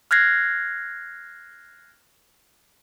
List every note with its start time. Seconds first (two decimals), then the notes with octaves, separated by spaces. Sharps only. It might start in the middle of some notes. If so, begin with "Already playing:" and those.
0.11 F6 F#6 G#6 A#6 C7